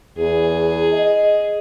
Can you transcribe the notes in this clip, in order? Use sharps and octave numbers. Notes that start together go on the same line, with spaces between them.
E2 G#4
D#5